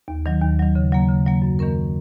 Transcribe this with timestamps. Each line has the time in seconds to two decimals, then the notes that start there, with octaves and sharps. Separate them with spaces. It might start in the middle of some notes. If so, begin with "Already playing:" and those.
0.08 D#2
0.26 D#3 F#3
0.41 D#2
0.59 D#3 F#3
0.75 C#3
0.92 F#3 A#3
1.09 C#3
1.26 F#3 A#3
1.42 F#2
1.59 D#3 A#3 C#4 A#4